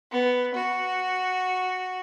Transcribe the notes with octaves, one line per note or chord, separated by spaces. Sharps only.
B3
F#4